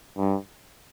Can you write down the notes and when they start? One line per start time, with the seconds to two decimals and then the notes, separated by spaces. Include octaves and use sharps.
0.18 G2